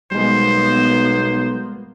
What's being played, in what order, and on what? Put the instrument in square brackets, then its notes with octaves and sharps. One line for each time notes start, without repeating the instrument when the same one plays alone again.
[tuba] B1 [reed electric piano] G3 G#3 [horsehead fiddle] A#3 B3 [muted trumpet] C5